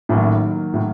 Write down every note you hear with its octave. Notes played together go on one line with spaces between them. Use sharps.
A1 A2 D#3 F#3 A#3
A2